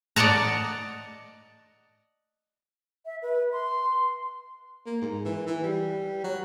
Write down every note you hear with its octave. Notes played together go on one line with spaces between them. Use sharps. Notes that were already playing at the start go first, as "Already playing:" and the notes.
D5 D#5 F#5 A5 A#5
E5
B4
C6
A#3
G#2
E3
E3
G3
F#3